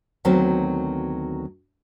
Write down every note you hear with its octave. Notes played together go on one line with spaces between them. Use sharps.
D2 D#3 F#3 B3 C4